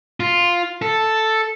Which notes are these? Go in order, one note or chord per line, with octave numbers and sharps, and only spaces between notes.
F4
A4